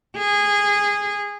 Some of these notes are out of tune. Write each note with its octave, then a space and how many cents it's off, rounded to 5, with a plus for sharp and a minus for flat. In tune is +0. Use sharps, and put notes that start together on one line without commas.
G#4 -20